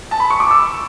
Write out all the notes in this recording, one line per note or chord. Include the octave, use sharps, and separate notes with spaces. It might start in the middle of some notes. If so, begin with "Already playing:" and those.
A5
B5
C#6
D6
E6